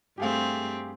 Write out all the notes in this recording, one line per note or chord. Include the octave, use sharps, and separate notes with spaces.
G2 A3 C4 G4 G#4 F5